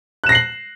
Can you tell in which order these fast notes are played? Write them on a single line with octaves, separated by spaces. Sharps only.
F#6 E7 A#6 C7 F#7